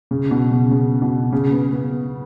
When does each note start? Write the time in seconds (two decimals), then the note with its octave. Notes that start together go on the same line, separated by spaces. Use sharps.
0.11 C#3
0.31 B2
0.52 C#3
0.71 C#3
1.02 B2
1.32 C#3
1.52 B3
1.73 B3